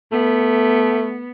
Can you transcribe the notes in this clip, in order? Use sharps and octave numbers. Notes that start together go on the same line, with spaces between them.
A3 B3